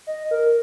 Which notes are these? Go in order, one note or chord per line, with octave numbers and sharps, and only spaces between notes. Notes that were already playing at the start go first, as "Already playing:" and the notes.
D#5
A#4